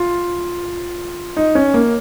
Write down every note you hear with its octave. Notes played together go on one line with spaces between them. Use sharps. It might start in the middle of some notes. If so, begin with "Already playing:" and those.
Already playing: F4
D#4
C#4
A#3